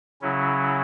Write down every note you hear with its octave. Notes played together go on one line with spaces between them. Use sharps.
C#3 F#3 C#4 E4